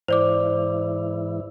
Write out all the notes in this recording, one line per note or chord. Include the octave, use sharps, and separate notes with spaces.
G#2 E3 E4 C5 D5 D6